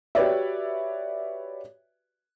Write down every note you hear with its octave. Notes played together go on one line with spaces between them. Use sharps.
F#4 G4 B4 C#5 D5 E5